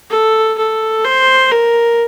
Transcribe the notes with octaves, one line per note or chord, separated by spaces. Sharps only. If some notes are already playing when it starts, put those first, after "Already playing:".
A4
A4
C5
A#4